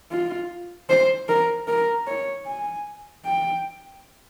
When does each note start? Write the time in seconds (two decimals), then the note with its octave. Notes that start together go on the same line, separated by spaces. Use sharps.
0.11 F4
0.89 C5
1.29 A#4
1.68 A#4
2.07 C#5
2.46 G#5
3.25 G5